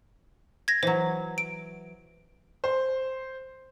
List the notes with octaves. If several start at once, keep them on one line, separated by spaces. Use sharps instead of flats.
G#6 A#6
E3 F#3 C5
D7
C5